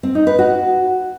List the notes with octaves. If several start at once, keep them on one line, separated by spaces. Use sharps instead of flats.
C4
D#4
B4
F#4